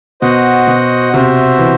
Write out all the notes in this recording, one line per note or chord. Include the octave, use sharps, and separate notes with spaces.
B2 F#4 C5 D#5 F#5
B2
C3 F#4 C5 E5
E3